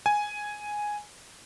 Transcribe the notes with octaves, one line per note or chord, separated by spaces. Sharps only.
G#5